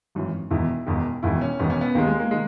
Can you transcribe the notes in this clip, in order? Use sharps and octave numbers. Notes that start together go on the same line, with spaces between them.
G#1 F#2 E3
E1 E2 D#3 E4
E1 E2 D#3
E1 E2 D#3 E4
C#4
E1 E2 D#3 B3
C#4
B3
D#2 D#3 G#3 A#3
G#3
A#3
D#3 G#3